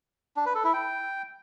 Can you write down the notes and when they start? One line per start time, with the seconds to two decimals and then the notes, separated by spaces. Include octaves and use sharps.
0.37 D4
0.46 B4
0.55 A4
0.64 E4
0.73 G5